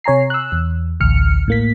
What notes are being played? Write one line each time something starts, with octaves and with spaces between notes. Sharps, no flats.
C3 C#5 G#5 A#5 C7
E6 F#6
E2
A1 D2 F6 C#7
A2 A#3 B6